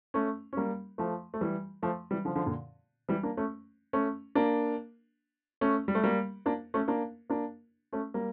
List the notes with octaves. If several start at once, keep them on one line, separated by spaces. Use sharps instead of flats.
A3 C#4
C#4
G3 A#3
F3 A3
A3
E3 G3
F3 A3
E3 G3
D3 F3
D3 F3
A#2 D3
E3 G3
A#3 D4
A3 C#4
A3 C#4
A#3 D4
A3 C#4
G3
A3
G3 A#3
A#3 D4
A3 C#4
A#3 D4
A#3 D4
A3 C#4
G3 A#3